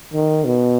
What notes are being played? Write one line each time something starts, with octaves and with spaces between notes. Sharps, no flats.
D#3
B2